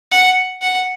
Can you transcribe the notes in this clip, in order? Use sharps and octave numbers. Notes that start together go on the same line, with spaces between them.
F#5
F#5